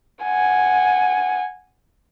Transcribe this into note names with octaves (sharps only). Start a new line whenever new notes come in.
F#5 G#5